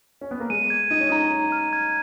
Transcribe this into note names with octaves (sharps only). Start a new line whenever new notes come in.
C#4
B3
A#3
G#3 D#7
G#6
D#4 D#7
C#4
D#4 A#5
D#7
F6
G#6